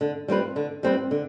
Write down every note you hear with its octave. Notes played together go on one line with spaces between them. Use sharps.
D3
G3 C4 F4 B4
D3
G3 C4 F4 B4
D3